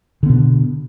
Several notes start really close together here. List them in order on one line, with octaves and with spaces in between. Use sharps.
D3 B3 B2